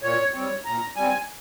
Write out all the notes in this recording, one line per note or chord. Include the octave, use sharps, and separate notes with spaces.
A#2 C#5
G3 C4 C#5
A#2 A#5
G3 C4 G#5